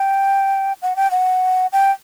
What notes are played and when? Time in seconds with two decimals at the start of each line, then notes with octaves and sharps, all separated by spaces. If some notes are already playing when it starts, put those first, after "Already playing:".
Already playing: G5
0.82 F#5
0.96 G5
1.11 F#5
1.72 G5